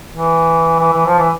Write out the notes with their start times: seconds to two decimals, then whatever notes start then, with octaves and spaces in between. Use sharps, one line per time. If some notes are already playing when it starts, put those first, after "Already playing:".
0.11 E3
0.80 E3
0.93 E3
1.06 F3
1.19 E3